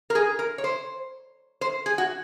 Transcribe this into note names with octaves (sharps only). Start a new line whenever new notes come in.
A#4
G#4
A#4
C#5
C5
C5
G#4
F#4